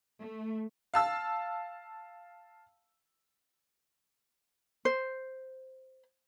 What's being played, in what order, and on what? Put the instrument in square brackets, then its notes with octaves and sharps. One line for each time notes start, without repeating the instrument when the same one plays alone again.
[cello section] A3
[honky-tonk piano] F5 A5 E6
[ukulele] C5